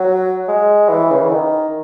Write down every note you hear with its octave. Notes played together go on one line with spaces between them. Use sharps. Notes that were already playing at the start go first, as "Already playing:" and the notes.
Already playing: F#3
G#3
E3
C#3
E3
D#3